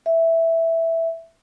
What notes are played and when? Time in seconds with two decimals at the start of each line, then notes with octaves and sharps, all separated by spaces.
0.06 E5